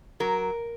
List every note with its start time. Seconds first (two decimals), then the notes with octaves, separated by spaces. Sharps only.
0.20 F#3 A#4